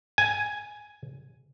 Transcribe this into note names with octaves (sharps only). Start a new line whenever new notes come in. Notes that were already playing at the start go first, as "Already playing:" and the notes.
G#5